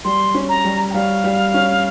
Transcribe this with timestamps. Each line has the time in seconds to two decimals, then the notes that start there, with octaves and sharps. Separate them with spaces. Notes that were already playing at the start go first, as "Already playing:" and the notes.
0.05 G3 C6
0.35 C#4
0.49 A#5
0.65 G3
0.90 G5
0.94 G3 F5
1.24 G3
1.54 C#4